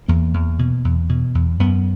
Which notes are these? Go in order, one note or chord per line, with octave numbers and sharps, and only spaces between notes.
E2 A#3
E2
B2
E2
B2
E2
F#2 B3